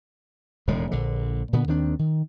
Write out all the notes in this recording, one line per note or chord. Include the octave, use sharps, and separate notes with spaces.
E1 D#2 A2 G#3
A#1 D3
A#2 D3 B3
D#2 D#3 C4 D4
D#3